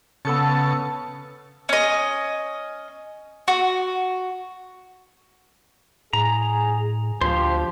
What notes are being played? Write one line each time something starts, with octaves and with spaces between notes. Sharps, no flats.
C#3 B3 A4 A5 C#7
C#4 D#5
F#4
A2 G#4 A#5
D2 F3 G4 C5